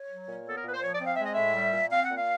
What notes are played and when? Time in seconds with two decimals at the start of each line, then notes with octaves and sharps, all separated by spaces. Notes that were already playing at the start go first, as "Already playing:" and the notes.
Already playing: C#5
0.09 F#3
0.27 A#2
0.46 B3 A4
0.57 A#4
0.63 A#2 B4
0.73 C5
0.82 F3 C#5
0.93 D5
1.00 C4
1.06 F5
1.15 G#3 E5
1.24 D#5
1.33 A2 E5
1.54 G3
1.73 A#2
1.91 C4 F5
2.03 F#5
2.09 A#2
2.16 F5